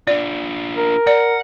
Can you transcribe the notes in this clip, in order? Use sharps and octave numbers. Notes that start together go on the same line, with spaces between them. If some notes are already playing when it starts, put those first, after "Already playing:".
D4 F4 D5
A#4
D5 F#5